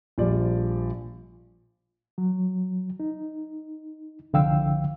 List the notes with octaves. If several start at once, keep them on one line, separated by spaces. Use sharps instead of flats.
A#1 F3 G3 D5
F#3
D#4
C2 D3 F3 F5 G5 E6